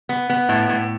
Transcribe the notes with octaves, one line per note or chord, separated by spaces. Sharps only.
B3
B3
A2
A2